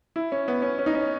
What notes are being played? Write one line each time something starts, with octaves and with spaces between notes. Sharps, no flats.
E4
C#4
B3
C#4
C#4
D#4
C#4